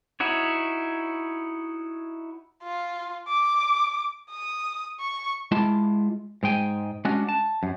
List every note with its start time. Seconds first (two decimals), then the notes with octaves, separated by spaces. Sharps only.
0.20 D#4 E4 F#4 C#5
2.63 F4
3.28 D6
4.30 D#6
5.00 C#6
5.52 G#3 E4 F4 A5
6.43 G#2 G#3 G5 G#5
7.05 G#3 C#4 D4 F#4
7.29 A5
7.63 F#2